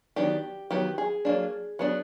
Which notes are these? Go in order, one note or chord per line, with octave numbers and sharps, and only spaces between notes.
D#3 F#3 B3 D4 G4
D#3 F#3 B3 G4
G#4
F#3 A#3 D4
F#3 B3 D4